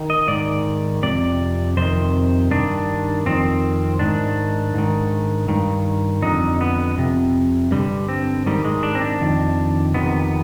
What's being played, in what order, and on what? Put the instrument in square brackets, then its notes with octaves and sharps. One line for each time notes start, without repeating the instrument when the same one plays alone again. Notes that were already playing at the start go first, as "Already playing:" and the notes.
Already playing: [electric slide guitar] D#3
D#5
G#2 D#3 D5
F2 C3 D5
F2 C3 D#3 C5
G2 D#3 D4
F2 D#3 C4
G#2 D#3 D4
G#2 D#3
G2 D#3
F2 D3 D#4
B3
F2 C3
G2 D3 G3
C4
G#2 D#3 G3
G#3
D4
C4
D4
F2 D#3
F2 C3 D#3 B3